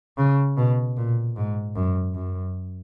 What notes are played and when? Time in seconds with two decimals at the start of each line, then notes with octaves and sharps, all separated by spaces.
0.18 C#3
0.57 B2
0.97 A#2
1.36 G#2
1.76 F#2
2.15 F#2